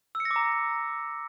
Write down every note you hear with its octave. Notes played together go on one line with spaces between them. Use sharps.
E6
C#7
A#6
D6
A#5